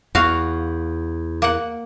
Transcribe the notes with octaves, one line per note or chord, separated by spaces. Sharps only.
E2 F#4 F5
A#3 F#5